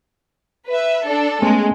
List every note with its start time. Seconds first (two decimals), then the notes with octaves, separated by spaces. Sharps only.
0.67 B4 E5
1.05 D4 A4
1.42 G#3 A3 B3 C#4